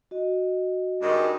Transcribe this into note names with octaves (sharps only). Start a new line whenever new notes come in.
F#4 D#5
G2 D#3 G#3